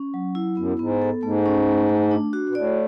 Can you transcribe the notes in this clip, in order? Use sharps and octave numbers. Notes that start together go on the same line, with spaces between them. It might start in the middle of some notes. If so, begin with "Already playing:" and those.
Already playing: C#4
F#3
E4
F#2 B3
G#2 B3
A4
G#2 A3
C#4
A3
A3
D4
F#4
B2
A2 D5